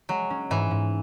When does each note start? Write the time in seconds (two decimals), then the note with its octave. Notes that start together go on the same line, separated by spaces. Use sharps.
0.09 F#3 G#3
0.30 C#4
0.50 G#2 E3
0.71 G#2